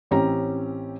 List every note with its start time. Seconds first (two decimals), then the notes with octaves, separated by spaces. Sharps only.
0.11 A1 C4 C#4 G4 A#5